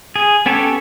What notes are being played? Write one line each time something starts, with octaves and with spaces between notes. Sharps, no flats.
G#4
B3 C#4 G4 A4 C#5